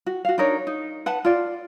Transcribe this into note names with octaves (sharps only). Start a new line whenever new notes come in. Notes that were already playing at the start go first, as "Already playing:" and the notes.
F#4
F#4 F5
D4 D#4 A#4 C#5
D#4
B4 F#5 A5
F4 D5